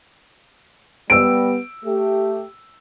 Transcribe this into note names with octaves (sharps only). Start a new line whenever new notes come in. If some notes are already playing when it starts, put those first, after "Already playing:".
G3 B3 E6 D7
A3 G4